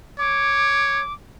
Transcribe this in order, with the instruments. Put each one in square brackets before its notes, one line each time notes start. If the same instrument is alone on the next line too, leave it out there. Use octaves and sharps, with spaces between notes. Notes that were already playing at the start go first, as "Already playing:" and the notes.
[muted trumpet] C#5 [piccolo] D6